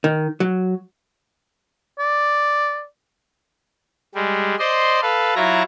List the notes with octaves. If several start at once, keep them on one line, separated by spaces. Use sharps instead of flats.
D#3
F#3
D5
G3 G#3
C5 D5 D#5 C6
A4 B4 F5
F#3 E4 F4 E5 A#5